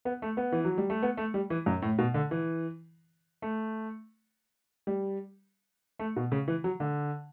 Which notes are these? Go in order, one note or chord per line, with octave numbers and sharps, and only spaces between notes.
B3
A3
B3
E3
F#3
G3
A3
B3
A3
G3
E3
F#2
A2
B2
D3
E3
A3
G3
A3
B2
C#3
E3
F#3
D3